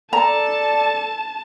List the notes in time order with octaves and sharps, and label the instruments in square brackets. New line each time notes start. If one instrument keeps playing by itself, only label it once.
[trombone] A4 [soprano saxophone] D5 [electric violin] A5 [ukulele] A#5